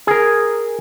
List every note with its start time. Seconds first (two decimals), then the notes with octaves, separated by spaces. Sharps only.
0.07 G#4 A#4